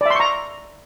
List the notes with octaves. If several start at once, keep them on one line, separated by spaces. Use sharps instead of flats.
D5 E5 A#5 C6 C#6